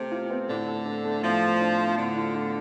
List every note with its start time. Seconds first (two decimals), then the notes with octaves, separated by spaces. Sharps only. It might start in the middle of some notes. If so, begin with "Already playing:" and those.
Already playing: C3 A3 C4 C5
0.11 F4
0.30 C4
0.48 A2 D3
0.68 A4
0.85 D4
1.05 A3
1.23 A2 F3
1.42 A4
1.61 D4
1.78 A3
1.97 A2 D3
2.17 F4
2.34 D4